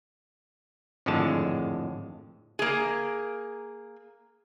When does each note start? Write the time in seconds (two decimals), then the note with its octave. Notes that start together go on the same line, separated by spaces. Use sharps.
1.06 G#1 F2 A2 D3 G#3 A5
2.59 A#3 G#4